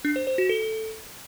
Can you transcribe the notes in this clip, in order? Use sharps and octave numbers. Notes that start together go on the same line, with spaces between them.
D4
C5
C5
F#4
A4